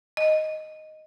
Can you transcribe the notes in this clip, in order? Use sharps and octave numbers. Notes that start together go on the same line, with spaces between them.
D#5